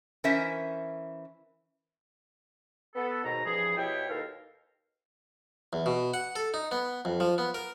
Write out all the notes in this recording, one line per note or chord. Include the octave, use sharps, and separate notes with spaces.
E3 C#4 A#4 C5 E5
B3 A4
D#2 G#2 B2 A#5
G2 E3 F3 G#4
B2 E4 G4 C#5 G5
D#2 B2 A4 A#4 F5
E2
B2
F#5
A4
D#4
B3
F2
F3
B3
A#4